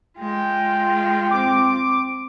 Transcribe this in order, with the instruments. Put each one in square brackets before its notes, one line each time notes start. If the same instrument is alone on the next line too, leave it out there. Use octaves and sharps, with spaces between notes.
[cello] G#3 F4 [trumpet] G5
[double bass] C4 [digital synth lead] D6